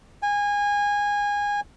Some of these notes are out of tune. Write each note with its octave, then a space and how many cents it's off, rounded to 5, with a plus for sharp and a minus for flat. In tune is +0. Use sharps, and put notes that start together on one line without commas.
G#5 -25